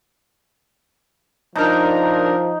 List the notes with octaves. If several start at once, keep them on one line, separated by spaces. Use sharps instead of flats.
F3 D4 D#4 A#4